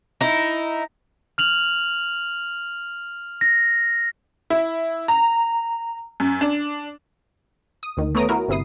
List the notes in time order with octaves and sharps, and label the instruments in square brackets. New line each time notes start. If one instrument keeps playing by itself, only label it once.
[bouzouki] D#4 E4
[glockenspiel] F6 F7 F#7
A#6
[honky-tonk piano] E4
A#5
F#2
D4
[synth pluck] D#6
D2 D#3
A3 B3 C#5 A#5 D#6 D7
E4 F#4 A#4
G1 C3 E4 D#6 C7